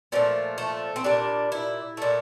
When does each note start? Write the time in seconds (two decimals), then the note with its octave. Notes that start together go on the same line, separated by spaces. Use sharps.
0.12 A#2 F3 A3 C4
0.58 A3
0.96 C4
1.04 A#2 G3 D4
1.52 E4
1.97 A#2 A3